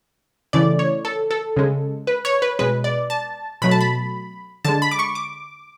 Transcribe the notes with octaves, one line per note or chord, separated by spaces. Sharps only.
C#3 E3 A3 D5
C#5
A4
A4
C#3 G#3
B4
C#5
B4
B2 G#3 B4
D5
A5
B2 F#3 A3 B5
A5
B5
D3 G#3 A5
B5
D6
C#6
D6